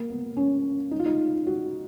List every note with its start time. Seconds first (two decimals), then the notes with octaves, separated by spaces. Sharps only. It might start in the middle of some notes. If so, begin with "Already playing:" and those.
Already playing: A#3
0.10 B3
0.37 C#4
0.91 D#4
0.99 F4
1.06 D#4
1.47 F#4